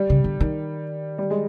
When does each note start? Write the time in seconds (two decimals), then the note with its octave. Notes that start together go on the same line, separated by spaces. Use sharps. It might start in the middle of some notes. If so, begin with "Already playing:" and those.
Already playing: G3
0.10 C#3
0.24 D3
0.40 D#3
1.18 G3
1.30 G#3